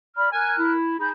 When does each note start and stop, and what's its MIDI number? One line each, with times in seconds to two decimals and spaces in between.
0.16 0.28 74
0.16 0.28 83
0.16 0.28 89
0.33 0.72 70
0.33 0.53 80
0.33 0.72 89
0.33 0.72 90
0.59 0.95 64
0.98 1.11 63
0.98 1.09 68
0.98 1.09 83
0.98 1.09 91